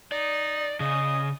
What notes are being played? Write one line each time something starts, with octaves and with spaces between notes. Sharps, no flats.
D#4 D5
C#3 D#5